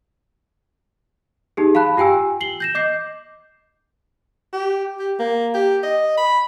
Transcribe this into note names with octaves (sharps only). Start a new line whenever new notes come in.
D#4 G4 G#4
F5 A5 B5 F#6
F4 G4 G5 G#5 E6
C7 F#7 G7
G6 A#6 E7
D#5 D6 G6 C7
G4
G4
A#3
G4
D#5
B5